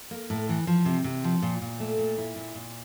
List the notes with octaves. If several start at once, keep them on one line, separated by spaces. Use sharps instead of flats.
A#3
A2
E3
F3
C3
C3
F3
A#2
A#2
A3
A#2
E4
A#2
A#2